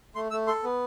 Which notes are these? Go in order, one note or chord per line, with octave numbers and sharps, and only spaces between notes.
A3 C6
A3 E6
A4 C6
B3